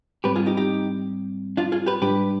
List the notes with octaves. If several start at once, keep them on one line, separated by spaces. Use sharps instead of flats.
G#2 G3 C4 G4 B4
F4 G#4
D#4 G4
D#4 G4
D4 F4
F4 G#4
G4 B4
G#2 G3 D4 G4 B4